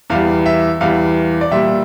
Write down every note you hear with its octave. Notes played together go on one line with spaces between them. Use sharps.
E2 E3 G3 F5
E5
E2 E3 G3 F5
D5
A#2 G3 E5